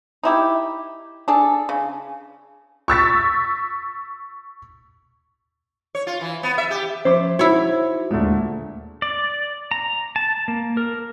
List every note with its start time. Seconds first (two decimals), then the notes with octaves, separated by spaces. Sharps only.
0.23 D#4 E4 G4
1.28 D4 G#4 A4
1.69 C#3
2.88 C#6 E6 A6 B6
5.95 C#5
6.07 F4
6.21 E3
6.43 B3
6.58 E5
6.71 G4
7.05 F3 C#4 C5 E5 D6
7.39 D#4 E4 F#4 C#5
8.11 D#2 A#2 D3 G#3 A3
9.02 D5
9.71 A#5
10.16 A5
10.48 A#3
10.77 A#4